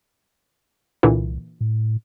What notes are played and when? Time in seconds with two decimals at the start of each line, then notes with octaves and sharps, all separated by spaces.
1.03 C2 A#2 D3 E3
1.61 A2